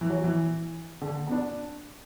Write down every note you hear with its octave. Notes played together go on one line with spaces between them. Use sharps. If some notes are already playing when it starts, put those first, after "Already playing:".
E3
F#3
E3
D3
B3
D4